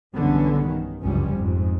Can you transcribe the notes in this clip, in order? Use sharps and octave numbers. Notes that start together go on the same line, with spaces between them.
B1 G2 D3 E3 B3 C#4
D#3
G1 C#2 F#2 F3 G3 C#4
F2 G#2